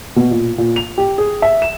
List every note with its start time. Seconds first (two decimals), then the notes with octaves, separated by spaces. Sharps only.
0.16 B2
0.31 A#2
0.58 A#2
0.76 F7
0.98 G4
1.18 G#4
1.42 E5
1.62 E7